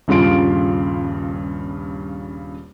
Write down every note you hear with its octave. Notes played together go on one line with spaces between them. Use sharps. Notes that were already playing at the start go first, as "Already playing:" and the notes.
D#1 G2 C#3 F4 C6 D7